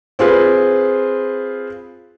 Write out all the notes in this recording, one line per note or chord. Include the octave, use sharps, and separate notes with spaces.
C4 F4 G#4 B4